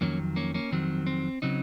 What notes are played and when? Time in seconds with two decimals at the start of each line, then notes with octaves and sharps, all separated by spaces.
0.01 F2 D#3 F#3 A#3 C#4
0.36 A#3 C#4
0.54 A#3 C#4
0.71 F2 D#3 F#3 C4
1.07 C4
1.42 C#3 F#3 C4 D#4